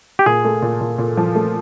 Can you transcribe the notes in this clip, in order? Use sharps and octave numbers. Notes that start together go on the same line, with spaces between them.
G4
A#2 G#4
A3
A#2
A#2
A#2
F3
A3